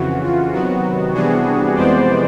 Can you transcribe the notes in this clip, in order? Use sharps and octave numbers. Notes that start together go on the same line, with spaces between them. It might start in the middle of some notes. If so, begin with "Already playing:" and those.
Already playing: F2 C#3 E3 F#4
F4
C3 D#3 F#3 B3 F#4
C3 E3 G3 B3 D4 F#4 G#4
F2 C3 E3 G#3 B3 C5 D5